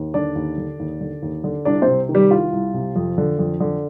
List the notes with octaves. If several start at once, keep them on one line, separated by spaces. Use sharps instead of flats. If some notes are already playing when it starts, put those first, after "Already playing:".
Already playing: D#2
D3 D4 D5
D#2
D3
D#2
D3
D#2
D3
C2 D4 D5
C4 C5
C3
D#3
G3 G4
C2 F4
C2
C3
F2
D3
F2
D3